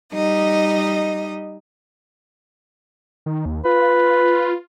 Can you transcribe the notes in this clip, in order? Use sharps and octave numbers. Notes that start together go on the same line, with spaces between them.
G3 D#4 D#5
D#3
D#2
F4 B4